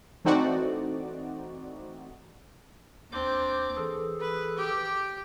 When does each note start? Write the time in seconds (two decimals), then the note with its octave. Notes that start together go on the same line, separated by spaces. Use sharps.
0.25 E3 A3 C4 D#4 F#4 D5
3.12 D#2 C4 D4 D6 G6
3.76 E3 G#4 A4
4.20 B4
4.58 G4 D6